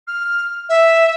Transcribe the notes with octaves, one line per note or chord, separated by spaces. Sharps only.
F6
E5